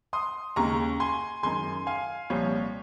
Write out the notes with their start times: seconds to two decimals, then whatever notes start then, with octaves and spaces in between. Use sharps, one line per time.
0.13 C6 D#6
0.56 D#2 C#3 G#3 A#5 C#6
1.00 G#5 C6
1.43 F#2 D#3 G#3 G#5 C6
1.87 F5 G#5
2.30 C2 A#2 F3 C#5